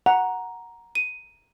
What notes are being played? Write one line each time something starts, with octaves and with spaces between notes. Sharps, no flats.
F#5 A#5
D#7